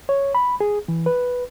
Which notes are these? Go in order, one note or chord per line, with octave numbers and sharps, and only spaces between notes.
C#5
B5
G#4
E3
B4